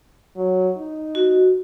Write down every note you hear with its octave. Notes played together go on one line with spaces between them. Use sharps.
F#3
D#4
F#4